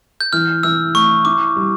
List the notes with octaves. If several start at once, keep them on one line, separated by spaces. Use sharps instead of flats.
G6
E3 F6
E3 E6
A3 C#6
E4 D6
G3